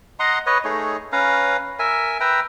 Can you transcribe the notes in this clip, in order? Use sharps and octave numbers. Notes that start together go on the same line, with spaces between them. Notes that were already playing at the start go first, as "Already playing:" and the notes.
D#5 F#5 A#5 C6
B4 C#5 D#5
A3 D#4 G#4 C#5
C#4 B4 F5 A#5
A#4 E5 G#5
B4 E5 G5 A#5